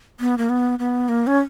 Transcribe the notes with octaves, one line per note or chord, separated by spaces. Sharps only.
B3
A#3
B3
B3
A#3
C#4